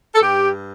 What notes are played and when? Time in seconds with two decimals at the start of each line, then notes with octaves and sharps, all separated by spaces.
0.15 A4
0.21 G2 G4